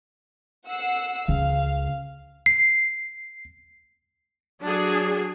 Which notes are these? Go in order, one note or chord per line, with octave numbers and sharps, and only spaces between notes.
F#5 E6 C7
C#2 C#3 F5
C7
F#3 D4 G#4